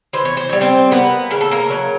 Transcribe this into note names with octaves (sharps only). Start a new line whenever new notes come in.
E3 C5
C#5
C5
G3 C#5
C4 C5
A#3 B3 B4
C#3 A#4
A4
A#3 A#4
F#3